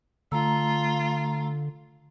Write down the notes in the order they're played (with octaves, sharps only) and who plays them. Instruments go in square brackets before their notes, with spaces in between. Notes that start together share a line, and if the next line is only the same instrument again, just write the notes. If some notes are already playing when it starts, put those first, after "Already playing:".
[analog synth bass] D3 [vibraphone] A3 A#5 E6 [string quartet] F4